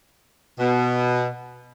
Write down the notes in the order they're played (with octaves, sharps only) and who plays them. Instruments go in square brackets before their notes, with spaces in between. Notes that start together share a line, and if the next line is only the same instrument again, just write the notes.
[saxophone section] B2